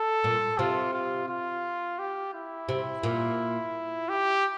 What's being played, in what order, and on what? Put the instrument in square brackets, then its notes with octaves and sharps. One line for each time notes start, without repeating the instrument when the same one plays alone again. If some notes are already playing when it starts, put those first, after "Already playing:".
Already playing: [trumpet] A4
[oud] A#2
[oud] C3 [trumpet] F4
[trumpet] F4
F4
G4
E4
[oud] C3
A#2
[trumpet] G4